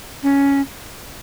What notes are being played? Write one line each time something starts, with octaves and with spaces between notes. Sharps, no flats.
C#4